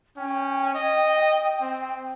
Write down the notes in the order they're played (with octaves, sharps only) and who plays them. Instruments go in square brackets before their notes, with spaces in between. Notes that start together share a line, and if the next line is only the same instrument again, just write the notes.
[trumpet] C#4 [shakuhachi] G5
[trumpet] D#5
C4